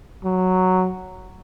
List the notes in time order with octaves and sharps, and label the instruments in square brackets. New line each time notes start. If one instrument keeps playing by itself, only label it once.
[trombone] F#3